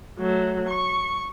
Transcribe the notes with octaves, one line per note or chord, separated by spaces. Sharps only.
F#3 A3
C#6